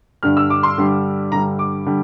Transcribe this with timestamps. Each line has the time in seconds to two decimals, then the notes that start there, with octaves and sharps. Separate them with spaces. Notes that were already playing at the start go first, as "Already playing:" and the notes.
0.23 G2 D3 G3 F6
0.37 E6
0.50 D6
0.63 C6
0.78 G2 D3 G3
1.32 G2 D3 G3 A#5
1.59 D6
1.86 D3 G3